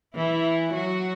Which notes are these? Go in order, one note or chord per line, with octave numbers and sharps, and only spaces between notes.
E3 E4
F#3 F#4